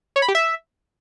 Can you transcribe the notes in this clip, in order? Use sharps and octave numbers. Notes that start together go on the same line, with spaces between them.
C#5
B5
G4
E5